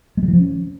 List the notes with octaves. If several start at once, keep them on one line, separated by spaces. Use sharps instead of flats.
G#3
G3
E3
F3
C#4